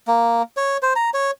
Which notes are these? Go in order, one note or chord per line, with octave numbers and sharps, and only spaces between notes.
A#3
C#5
C5
A#5
C#5